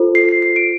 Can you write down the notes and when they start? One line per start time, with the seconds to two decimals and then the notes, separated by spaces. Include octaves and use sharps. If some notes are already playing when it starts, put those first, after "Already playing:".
Already playing: F4 A4 C5
0.15 C7
0.29 C7
0.42 C7
0.56 D7